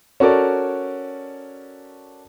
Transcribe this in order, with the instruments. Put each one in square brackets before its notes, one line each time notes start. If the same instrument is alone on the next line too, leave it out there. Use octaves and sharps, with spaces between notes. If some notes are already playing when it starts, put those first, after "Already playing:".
[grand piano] C#4 F#4 A4 A#4 D5